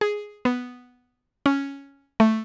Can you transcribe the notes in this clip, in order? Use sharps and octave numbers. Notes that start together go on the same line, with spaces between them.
G#4
B3
C#4
A3